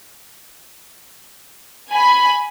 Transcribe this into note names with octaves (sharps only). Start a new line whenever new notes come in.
G#5 B5